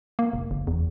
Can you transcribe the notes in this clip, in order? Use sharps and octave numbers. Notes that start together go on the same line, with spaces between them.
A#3
F1
F#1
E2